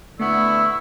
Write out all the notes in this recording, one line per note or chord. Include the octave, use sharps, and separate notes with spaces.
D3 A3 B3 E4 C#6 E6